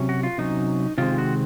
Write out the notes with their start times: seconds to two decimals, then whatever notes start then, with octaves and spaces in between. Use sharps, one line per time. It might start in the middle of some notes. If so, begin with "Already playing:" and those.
Already playing: C3 F#3 C#4
0.09 F#4
0.23 F4
0.38 C3 F#3 C#4 D#4
0.98 C3 D#3 G#3 C4 F4
1.18 F#4